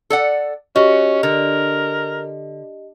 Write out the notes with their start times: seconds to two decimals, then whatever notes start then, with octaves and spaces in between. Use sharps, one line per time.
0.10 A4 D5 F#5
0.76 C#4 F#4 G4 D#5
1.23 D3 A#4